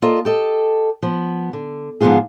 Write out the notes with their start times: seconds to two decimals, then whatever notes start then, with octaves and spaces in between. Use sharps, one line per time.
0.02 A#3 F4 A4 D5 D#5
0.25 G4 A4 D#5
1.02 F3 B3
1.53 D3
2.01 G#2 D3 F3 B3 F4 G#4